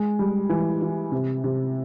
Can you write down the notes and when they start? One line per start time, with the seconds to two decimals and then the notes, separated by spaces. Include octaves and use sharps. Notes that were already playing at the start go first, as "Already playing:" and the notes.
Already playing: G#3
0.19 G3
0.50 E3
0.82 E3
1.12 C3
1.44 C3